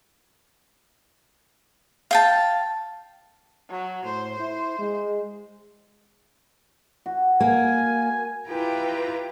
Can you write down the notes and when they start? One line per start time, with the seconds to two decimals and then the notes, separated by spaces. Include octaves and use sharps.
2.11 F5 G5 A5
3.69 F#3
4.05 A2 C5
4.39 E4
4.79 G#3
7.06 F#4
7.40 A#3 G#5
8.47 E4 F4 G4 B4 G5 A#5